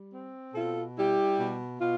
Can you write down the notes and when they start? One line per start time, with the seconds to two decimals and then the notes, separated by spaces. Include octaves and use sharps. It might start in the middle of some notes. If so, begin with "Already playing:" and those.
Already playing: G3
0.12 C4
0.54 B2 F4 A4
0.96 G3 E4 G4
1.38 B2
1.80 B2 F4